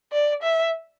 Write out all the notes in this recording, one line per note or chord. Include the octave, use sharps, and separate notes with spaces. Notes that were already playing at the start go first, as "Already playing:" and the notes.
D5
E5